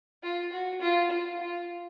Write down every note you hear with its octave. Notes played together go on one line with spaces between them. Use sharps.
F4
F#4
F4
F4
F4